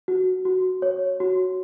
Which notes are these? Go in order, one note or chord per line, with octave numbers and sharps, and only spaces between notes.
F#4
F#4
C#5
F#4